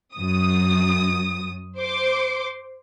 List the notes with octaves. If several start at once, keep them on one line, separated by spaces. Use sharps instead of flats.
F#2 D#6
C5 C6 D6